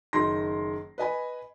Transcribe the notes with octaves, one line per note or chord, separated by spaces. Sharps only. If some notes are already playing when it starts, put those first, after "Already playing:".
F#1 D#3 D#4 C6 A#6
B4 D#5 G#5 B5